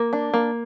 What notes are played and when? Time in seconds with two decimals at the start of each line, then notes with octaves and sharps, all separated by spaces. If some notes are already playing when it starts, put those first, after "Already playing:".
Already playing: A#3
0.13 D4
0.34 A#3